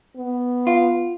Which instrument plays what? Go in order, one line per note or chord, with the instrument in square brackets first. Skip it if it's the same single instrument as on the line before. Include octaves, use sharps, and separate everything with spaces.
[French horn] B3
[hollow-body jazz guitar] F4